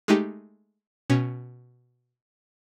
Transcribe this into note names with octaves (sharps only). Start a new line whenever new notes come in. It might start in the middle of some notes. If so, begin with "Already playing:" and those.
G#3 A3 D#4 G4
B2 C#4